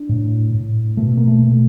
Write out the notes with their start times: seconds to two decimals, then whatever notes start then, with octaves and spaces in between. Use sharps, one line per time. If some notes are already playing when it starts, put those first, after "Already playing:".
Already playing: D4
0.09 A2
0.54 A2
0.97 B2 A3
1.17 A#3
1.27 A3
1.42 B2